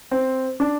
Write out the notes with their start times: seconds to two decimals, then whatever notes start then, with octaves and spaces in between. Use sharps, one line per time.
0.11 C4
0.60 D4